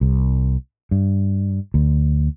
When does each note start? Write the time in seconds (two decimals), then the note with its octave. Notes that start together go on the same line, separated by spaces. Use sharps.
0.01 C2
0.91 G2
1.74 D2